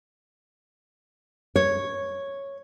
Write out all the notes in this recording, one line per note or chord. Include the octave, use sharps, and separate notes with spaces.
C#5